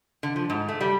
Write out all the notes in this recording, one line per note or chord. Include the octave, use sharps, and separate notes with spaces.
D3
F3
G#2
A3
G3